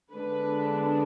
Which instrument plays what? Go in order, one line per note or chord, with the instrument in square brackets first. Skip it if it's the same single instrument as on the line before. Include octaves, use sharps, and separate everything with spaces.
[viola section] D3 G#3 B3 D4 B4